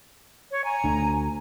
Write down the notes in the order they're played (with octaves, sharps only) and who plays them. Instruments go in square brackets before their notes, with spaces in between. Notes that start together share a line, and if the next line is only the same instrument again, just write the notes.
[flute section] C#5
G#5 A#5
[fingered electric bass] D2 D3